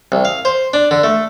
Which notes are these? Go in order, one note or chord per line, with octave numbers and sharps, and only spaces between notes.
C2
F5
C5
D4
D3
A3